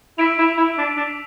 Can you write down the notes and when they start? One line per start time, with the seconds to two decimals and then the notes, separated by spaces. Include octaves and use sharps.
0.18 E4 E6 B6 D7 F7
0.38 E4
0.57 E4
0.78 D4
0.97 D4